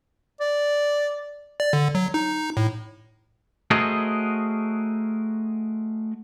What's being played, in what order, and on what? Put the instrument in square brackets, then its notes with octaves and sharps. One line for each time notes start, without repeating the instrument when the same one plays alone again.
[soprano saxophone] D5
[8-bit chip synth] D5
D3
F#3
D#4
A2
[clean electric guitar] A3 F#4 G#4 A#4 C5 D#5